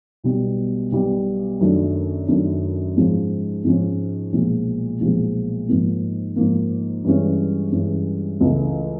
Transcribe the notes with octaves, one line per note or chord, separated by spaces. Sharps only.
B1 B2 G3 B3
B1 B2 G3 B3
F#2 D#3 F#3 A3 D4
F#2 D#3 F#3 A3 D4
G#2 F3 G#3 C#4
G#2 F3 G#3 C#4
B1 A#2 F3 G#3
B1 A#2 F3 G#3
G#2 F3 A#3
G#2 F3 A#3
G2 E3 G#3 C#4
G2 E3 G#3 C#4
C#2 C#3 E3 A3